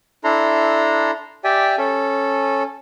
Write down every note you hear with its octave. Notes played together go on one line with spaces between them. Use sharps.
D4 E4 A4 A#5 C6
G4 D5 E5 G5 G#5
C#4 A4